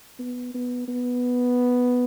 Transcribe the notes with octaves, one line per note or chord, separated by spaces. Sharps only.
B3
B3
B3